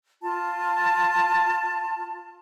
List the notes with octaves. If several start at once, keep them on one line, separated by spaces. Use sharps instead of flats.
F4 A5